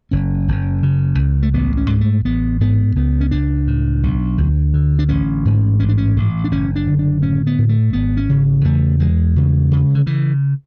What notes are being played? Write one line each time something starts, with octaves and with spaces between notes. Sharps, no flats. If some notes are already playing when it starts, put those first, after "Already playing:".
F#1 C#4
F#1
C#3
C#2
A3
A1 B3
C#4
G#2
A3
A1 B3
G#2 B3
C#2 B3
C#4
C#2 D4
A2
B1
D2
D3
D4
A1 C#4
G#2
A1 C#4
D4
C#4
A1
D4
F#1 C#4
D4
D3
D4
A2 C#4
B3
A2
A3
G#1 B3
C#4
C#3
E2 A3
E2 G#3
C#3
C#3
D3
C#3 E3